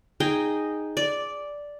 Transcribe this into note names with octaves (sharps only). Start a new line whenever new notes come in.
D#4 G#4 D#5 G5
D5